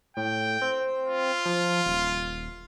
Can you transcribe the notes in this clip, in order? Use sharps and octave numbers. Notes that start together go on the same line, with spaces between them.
A2 G5
C4
F4
F3
D#1